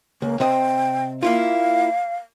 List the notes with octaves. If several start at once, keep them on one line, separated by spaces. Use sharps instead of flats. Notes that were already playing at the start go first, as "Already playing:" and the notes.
C#2 A#3
C3 C4 D#5 G5
A#3 E4 F4 F5